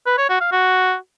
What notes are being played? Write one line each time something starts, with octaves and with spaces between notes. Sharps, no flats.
B4
C#5
F#4
F5
F#4